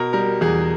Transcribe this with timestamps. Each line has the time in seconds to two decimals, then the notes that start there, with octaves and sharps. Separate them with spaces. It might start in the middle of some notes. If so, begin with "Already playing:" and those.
Already playing: B2 A#4
0.13 G3 A#4
0.41 E2 G#4